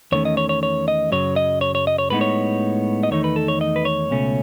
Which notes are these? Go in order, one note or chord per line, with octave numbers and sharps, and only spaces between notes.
E2 D#3 A3 C#4 C#5
D#5
C#5
C#5
C#5
D#5
F#2 C#3 F#3 C#5
D#5
C#5
C#5
D#5
C#5
A2 G#3 B3 D#4 B4
C#5
D#5
E2 D#3 A3 D#4 C#5
B4
A4
C#5
D#5
B4
C#5
C#2 B2 A3 C#4